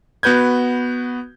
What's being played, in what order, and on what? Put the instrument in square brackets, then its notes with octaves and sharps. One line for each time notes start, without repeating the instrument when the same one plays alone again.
[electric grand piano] B3 F#4 B4 G6 G#6